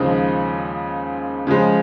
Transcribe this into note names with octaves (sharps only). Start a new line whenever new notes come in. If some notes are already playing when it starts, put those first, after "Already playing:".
Already playing: D#2 C#3 F3 G#3 D#4
C#3 F3 G#3